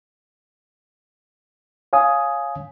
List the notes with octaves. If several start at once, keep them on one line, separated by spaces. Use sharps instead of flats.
C#5 F5 G#5 D#6